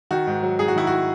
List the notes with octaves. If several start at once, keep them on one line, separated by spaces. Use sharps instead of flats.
D#3 F#4
G#2
F#3
G#2 G#4
F#4
D#3 E4
F#4